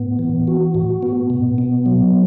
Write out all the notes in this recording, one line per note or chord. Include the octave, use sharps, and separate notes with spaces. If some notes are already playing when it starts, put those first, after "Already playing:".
Already playing: A2 B3
E3
F#4
A2
B3
B2
B3
F#3